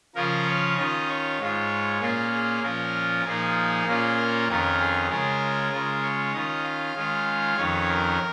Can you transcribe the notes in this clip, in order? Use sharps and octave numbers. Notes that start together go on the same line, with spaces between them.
C#3 F3 C#4 F4 A#4
C#5
D#3 C#4 F4 D#5
C#5
G#2 G#3 F4
A#2 A#3 C#4 F4 G#4
G#4
A#2 F3 C#4 F4 A#4
A#2 F3 A#3 D#4 G#4
A#2 A#3 C#4 F4
A#4
F2 D#3 C#4 F4 A#4
G#4
C#3 G#3 C#4 F4 A#4
C#3 G#3 F4
C#5
D#3 C#4 F4 D#5
F5
D#3 G#3 C#4 F4
F2 D#3 C#4 C#5
A#4